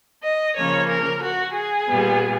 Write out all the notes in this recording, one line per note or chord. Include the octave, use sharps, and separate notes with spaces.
D#5
C#3 F3 A#3 C#4 C#5
A#4
F#4
G#4
A#2 G3 B3